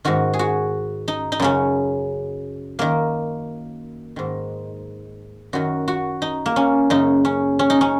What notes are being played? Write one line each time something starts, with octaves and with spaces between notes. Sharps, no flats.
G#2 D#3 F#4
G#4
F#4
D#4
D#4
F#2 C#3 C#4
F#2 D#3 A#3
G#2 D#3
F#2 D#3 F#4
F#4
D#4
A#3
C#4
F#2 C#3 D#4
C#4
C#4
D#4
C#4